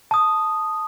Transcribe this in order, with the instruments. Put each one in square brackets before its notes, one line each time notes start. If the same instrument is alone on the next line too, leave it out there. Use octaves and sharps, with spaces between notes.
[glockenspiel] A5 D#6